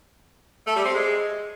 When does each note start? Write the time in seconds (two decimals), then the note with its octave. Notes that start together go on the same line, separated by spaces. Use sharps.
0.67 A3
0.76 G3
0.85 C4
0.94 G#3